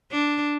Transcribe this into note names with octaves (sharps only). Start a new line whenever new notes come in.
D4